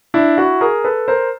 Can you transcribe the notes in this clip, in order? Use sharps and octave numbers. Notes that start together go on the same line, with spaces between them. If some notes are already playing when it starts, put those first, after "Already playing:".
D4 E4
E4 F#4
G#4 A#4
A4 B4
A#4 C5